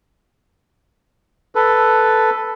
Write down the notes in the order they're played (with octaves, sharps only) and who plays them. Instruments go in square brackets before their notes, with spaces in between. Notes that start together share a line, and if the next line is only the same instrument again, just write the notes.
[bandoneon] A4 B4